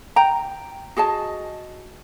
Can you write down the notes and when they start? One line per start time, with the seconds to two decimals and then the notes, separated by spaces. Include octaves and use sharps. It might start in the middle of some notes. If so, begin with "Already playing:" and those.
0.16 G5 A#5
0.97 F#4 G#4 D#5 A5